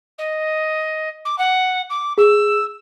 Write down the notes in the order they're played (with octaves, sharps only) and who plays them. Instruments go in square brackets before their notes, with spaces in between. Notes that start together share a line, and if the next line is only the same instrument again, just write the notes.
[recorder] D#5
D6
F#5
D6
[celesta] G#4 [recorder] E6